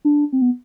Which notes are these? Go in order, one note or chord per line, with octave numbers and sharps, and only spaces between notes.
D4
C4
B3